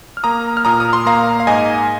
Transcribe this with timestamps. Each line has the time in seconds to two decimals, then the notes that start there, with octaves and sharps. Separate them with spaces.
0.17 F6
0.23 A#3 A#5 D#6
0.57 F6
0.65 A#2 A#5 D#6
0.80 D#6
0.93 C6
1.06 A#3 F5 A#5
1.40 F5
1.47 G#2 D#5 G#5